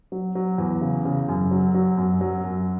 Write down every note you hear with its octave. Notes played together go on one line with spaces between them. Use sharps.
F#3
F#3
E2
C#3
C#3
F#2
F#3
F#3
F#2
F#3
F#2